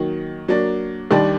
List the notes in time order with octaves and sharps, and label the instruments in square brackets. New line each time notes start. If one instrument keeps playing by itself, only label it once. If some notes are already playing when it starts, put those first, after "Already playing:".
Already playing: [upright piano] D#3 F#3 A#3
F#3 A#3 D4
D#2 D#3 G3 D4